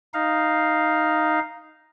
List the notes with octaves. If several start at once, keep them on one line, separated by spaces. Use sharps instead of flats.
D#4 F5